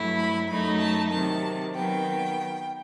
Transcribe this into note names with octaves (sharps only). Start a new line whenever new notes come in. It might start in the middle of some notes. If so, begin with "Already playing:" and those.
Already playing: G2 F#3 A3 E4
B5
F#2 F#3 A3 D#4 B5
A5
C3 D#3 F#3 A5
D#3 F#3 B3 G5